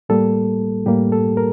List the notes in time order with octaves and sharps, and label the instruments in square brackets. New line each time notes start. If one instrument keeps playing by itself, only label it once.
[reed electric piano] A2 G3 A#3 A4
A2 G3 A#3 G4
A4
A#4